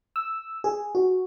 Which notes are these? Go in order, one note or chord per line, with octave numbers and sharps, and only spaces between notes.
E6
G#4
F#4